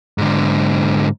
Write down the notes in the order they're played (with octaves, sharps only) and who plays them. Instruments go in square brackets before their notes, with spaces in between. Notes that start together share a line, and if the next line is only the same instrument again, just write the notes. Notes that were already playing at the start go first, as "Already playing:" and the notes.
[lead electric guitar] G#2 D3